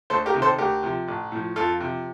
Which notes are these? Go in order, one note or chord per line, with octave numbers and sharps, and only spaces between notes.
D2 A4 C5
G4 A#4
C3 D#3
A4 C5
D2 G4 A#4
C3 F3
A1
A2 F3
F2 F4 A4
C3 F3